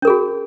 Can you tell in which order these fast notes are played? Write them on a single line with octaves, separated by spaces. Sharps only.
C#4 A#4 G#4 F#4